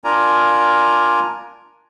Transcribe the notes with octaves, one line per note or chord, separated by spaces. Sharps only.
D4 F4 A#4 D5 G#5 A#5